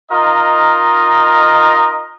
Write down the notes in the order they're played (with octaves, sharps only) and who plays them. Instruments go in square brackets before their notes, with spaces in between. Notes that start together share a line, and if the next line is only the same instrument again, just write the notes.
[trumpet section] D#4 F4 A#4 D#5